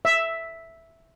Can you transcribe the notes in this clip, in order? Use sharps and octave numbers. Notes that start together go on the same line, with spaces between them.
E5